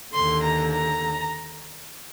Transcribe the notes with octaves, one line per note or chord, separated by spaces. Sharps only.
D#2 D3 C6
A#5
A#5